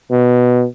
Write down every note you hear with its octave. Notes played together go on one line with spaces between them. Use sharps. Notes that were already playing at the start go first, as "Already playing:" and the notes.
B2